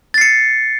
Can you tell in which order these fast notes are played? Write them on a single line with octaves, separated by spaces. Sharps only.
A6 C7 C#7